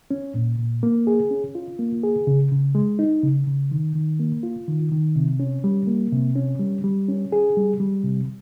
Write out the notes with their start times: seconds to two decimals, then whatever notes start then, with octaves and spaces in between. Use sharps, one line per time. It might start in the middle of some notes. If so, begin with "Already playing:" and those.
0.11 C#4
0.35 A#2
0.59 A#2
0.83 A#3
1.07 G#4
1.31 C#4
1.55 F4
1.79 A#3
2.03 G#4
2.27 C#3
2.51 C#3
2.75 G#3
2.99 D#4
3.23 C#3
3.47 C#3
3.71 D#3
3.95 D#3
4.19 A#3
4.43 F4
4.68 D#3
4.92 D#3
5.16 C3
5.40 C#4
5.64 G3
5.87 A#3
6.12 C3
6.36 C#4
6.60 G3
6.84 G3
7.09 C#4
7.32 G#4
7.57 G3
7.80 G3
8.04 C3